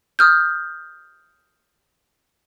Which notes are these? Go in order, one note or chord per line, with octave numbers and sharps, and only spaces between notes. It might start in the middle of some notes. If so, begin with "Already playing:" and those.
D#6 F6 G6